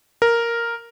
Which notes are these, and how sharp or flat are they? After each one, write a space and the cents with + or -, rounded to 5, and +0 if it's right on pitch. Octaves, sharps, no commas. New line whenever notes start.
A#4 +0